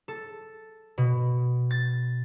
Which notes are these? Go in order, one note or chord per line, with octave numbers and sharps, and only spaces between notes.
A4
B2
A6